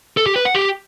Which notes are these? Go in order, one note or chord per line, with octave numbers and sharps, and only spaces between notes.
A4
G4
B4
F#5
G4